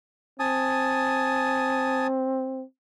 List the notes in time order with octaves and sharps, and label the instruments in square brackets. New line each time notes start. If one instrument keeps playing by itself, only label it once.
[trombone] C4 [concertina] G#5 A5 D#6